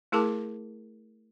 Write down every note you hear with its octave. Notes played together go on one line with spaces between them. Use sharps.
A3 E4 G#4 A#4 A5 D6